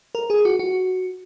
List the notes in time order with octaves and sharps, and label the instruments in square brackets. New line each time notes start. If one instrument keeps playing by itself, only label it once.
[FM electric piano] A#4
G#4
F#4
F#4